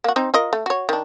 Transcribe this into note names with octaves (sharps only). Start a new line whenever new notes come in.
A#3 F#4
C4 D#4 C5
F4 A#4 D#5
A3
F#4 C#5
D#3 D4